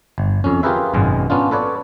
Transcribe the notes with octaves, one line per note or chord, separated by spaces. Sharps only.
G1
F2 C#4
F4 G4 G#4 A#4 B4 E5
G#1 F#2 B2 G#3
B3 C#4 D4 F4
A4 B4 C#5 D5